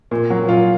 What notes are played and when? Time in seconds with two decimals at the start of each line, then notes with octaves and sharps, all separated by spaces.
0.11 A#2
0.30 F#3
0.48 A#2 F4